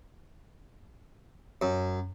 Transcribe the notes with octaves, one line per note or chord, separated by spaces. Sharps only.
F#2